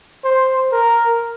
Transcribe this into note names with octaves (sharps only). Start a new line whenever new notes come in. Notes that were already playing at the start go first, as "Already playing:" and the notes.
C5
A#4